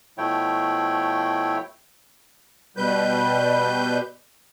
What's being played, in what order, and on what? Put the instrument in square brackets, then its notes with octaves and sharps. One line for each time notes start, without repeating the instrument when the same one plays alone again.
[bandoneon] B2 F3 A3 E4 C#5 G5
[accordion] B2 G3 B4 G6